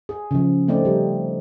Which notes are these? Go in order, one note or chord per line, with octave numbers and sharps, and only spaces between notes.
G#4
C#3 F3
A3 C4 D#4 D5
G3